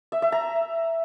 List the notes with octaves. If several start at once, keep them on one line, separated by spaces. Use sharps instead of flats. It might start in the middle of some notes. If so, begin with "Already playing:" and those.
E5
E5
A#5